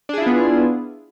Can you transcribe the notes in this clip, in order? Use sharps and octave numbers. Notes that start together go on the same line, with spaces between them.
B3 D4 E4 F4 G#4